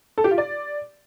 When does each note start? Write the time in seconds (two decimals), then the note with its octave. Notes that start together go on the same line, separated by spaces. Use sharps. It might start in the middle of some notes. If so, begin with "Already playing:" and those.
0.18 A4
0.24 G4
0.31 F4
0.38 D5